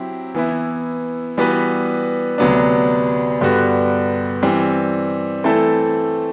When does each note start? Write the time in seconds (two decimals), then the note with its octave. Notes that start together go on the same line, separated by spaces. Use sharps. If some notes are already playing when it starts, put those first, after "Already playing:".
Already playing: F#3 C4 E4 G4
0.35 E3 B3 E4
1.37 E3 G3 B3 F#4 B4
2.38 D2 C3 F#3 B3 D4
3.41 G2 D3 G3 B3 F#4
4.42 E3 G3 C4
5.44 E3 A3 C4 E4 A4